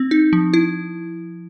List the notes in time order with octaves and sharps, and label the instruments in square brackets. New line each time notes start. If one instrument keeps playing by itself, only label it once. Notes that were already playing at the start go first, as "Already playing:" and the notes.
Already playing: [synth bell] C4
D#4
F3
E4